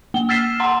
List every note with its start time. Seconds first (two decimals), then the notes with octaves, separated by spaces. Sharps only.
0.14 A#3 G7
0.29 E6 F6 A6 B6 C7 E7
0.60 F#5 A#5 C6